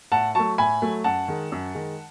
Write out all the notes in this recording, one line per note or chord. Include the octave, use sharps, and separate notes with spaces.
A2 F#5 A5
F#3 A3 A5 C#6
A2 G#5 B5
F#3 A3
F#2 F#5 A5
D#3 G#3
F#2
D#3 G#3